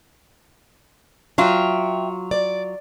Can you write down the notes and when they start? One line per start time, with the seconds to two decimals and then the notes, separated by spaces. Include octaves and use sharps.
1.38 F#3 F4 E5 G5
2.31 D5